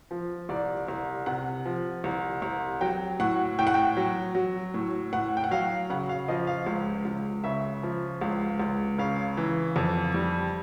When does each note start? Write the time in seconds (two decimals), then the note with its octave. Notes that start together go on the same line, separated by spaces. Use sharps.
0.11 F3
0.49 C2 D5
0.88 C2
1.26 C3 F#5
1.65 F3
2.04 C2
2.42 C2
2.81 F#3 G5
3.19 A2 F#5
3.59 A2 G5
3.67 F#5
3.74 G5
3.97 F#3
4.35 F#3
4.74 A2
5.13 A2 F#5
5.37 G5
5.44 F#5
5.51 F#3 F5
5.90 C#3 F#5
6.09 F5
6.28 F3 D#5
6.47 F5
6.66 C#2
7.05 C#2
7.44 C#3 E5
7.83 F3
8.21 C#2 F5
8.60 C#2
8.99 C#3 F5
9.37 E3
9.76 F2
10.14 G3